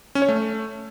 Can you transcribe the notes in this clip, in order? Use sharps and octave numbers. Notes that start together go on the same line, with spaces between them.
C#4
C#5
A3